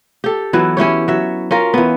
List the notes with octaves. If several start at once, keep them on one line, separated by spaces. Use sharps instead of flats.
G4 A4
E3 F#3 B3 E4
C#4 E4 G4 C#5
F#3 E5
C#4 F4 A#4
E3 B3